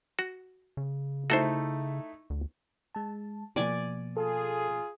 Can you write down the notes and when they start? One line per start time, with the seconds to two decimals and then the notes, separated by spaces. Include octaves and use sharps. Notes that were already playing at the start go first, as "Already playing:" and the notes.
0.19 F#4
0.77 C#3
1.30 A3 D#4 E4 F#4 A4 C5
2.30 D2
2.95 G#3 A5
3.56 B2 F3 A#3 D5 G#5 D6
4.17 F4 G#4 A4